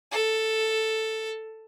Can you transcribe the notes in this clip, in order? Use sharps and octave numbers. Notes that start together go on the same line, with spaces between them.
A4